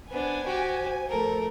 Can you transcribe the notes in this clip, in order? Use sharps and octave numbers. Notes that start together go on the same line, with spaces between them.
B3 D4 C5 G#5
F#4 G4
F2 A3 A4 A#4